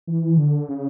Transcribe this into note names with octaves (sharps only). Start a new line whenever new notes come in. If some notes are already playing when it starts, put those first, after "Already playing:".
E3
D3
C#3